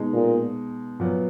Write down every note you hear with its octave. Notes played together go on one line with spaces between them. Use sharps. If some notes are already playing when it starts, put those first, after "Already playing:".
Already playing: B2 G#3 D#4
A#2
A#2 F#3 B3